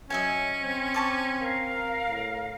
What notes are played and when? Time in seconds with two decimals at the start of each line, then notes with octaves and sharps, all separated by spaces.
0.10 F#3 C#4 D#5 E5 G#5
0.61 C4
0.94 D5 A5 C#6
1.40 A#4 F5
2.08 A2